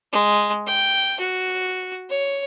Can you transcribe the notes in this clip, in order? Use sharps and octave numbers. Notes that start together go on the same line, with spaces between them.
G#3
G5
F#4
C#5